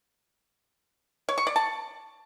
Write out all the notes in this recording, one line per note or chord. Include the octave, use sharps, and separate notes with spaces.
C#5
C#6
D5
A5